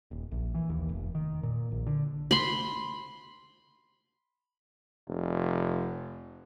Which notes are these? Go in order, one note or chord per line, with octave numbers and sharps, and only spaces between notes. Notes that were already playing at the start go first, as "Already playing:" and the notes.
D#1
A#1
E3
D#2
F1
D#3
A#2
A#1
D3
B5 C6
F1